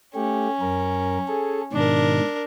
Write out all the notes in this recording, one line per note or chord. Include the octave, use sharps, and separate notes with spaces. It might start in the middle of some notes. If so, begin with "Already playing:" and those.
A3 C#4 G4
F#2 A#4
G#4 A4
G#2 B2 D#3 D4 A#4